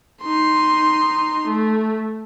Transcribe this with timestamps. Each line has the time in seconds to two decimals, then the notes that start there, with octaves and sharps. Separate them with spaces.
0.23 D#4 C6
1.47 A3